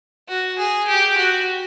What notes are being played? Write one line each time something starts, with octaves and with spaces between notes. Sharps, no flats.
F#4
G#4
G4
F#4